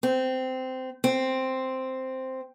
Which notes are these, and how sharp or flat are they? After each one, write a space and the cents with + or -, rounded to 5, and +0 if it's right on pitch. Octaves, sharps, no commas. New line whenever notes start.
C4 -15
C4 +0